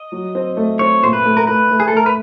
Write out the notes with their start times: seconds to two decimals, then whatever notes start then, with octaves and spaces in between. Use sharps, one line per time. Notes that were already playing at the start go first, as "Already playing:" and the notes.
Already playing: D#5
0.12 F#3
0.35 C4
0.57 A3
0.79 C4 C#5
1.03 A#2 C5
1.13 B4
1.25 A3
1.37 A#4
1.47 A3 B4
1.70 A3
1.80 G#4
1.88 A4
1.92 A3 A#4
2.06 B4